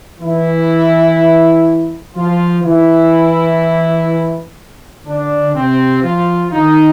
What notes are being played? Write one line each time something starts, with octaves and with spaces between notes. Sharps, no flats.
E3 E4
F3 F4
E3 E4
D3 D4
C3 C4
F3 F4
D#3 D#4